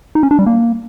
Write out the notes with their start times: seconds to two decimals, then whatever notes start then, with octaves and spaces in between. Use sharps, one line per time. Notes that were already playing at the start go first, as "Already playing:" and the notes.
0.15 D#4
0.23 C#4
0.31 D4
0.39 G3
0.46 A#3